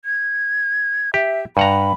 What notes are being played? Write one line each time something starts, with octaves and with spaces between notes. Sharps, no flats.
G#6
G4 E5
G2 F#5 A#5 B5